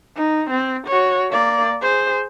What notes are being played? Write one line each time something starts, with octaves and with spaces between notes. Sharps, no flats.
D#4
C4
F#4 C#5
A#3 D5
G#4 C5